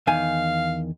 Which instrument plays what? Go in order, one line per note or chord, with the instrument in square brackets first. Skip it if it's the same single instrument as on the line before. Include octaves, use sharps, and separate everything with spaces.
[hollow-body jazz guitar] E2 D#3 G#5 [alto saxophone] F5